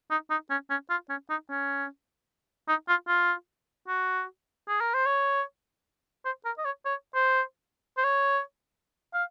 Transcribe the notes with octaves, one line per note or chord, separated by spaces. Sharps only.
D#4
D#4
C#4
C#4
F4
C#4
D#4
C#4
D#4
F4
F4
F#4
G#4
A#4
C5
C#5
C5
A#4
D#5
C#5
C#5
C5
C5
C#5
F5